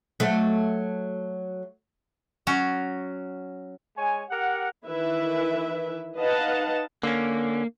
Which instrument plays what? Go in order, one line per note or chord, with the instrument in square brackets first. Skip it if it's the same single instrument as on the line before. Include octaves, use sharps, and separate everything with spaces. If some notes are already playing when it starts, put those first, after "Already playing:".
[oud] F#3 A3
[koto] F#3 C#4 F#4
[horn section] G#3 C#5 G#5
G4 A#4 F#5
[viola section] D#3 E3 E4 B4 E5
D#4 B4 D#5 F5 F#5 A5
[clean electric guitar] D3 C#4 [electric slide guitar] A#3